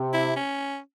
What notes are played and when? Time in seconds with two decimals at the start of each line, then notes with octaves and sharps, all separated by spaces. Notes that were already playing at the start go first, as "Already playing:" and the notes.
Already playing: C3
0.13 E4
0.36 C#4